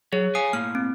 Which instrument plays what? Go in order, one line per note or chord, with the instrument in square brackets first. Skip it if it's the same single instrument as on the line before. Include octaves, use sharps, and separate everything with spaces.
[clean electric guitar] F#3 [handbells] G#4 C#5
[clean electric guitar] F5 G#5 [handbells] D#6
[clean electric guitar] A2 A#3 [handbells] F6
[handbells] C4